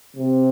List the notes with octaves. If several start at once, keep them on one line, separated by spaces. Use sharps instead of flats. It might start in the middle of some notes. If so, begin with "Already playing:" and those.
C3